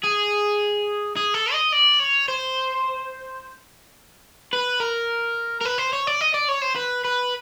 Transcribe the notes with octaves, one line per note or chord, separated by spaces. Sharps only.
G#4
G#4
A4
D#5
D5
C#5
C5
B4
A#4
A#4
B4
C5
C#5
D5
D#5
D5
C#5
C5
B4
B4